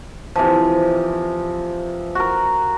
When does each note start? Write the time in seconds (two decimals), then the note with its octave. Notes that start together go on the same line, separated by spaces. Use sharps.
0.35 C3 E3 F3
2.15 F#4 A#4